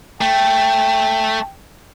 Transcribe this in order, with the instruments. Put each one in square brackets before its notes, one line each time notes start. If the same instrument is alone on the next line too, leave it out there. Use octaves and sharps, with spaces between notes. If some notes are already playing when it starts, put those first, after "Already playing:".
[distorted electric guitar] A3 [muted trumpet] G5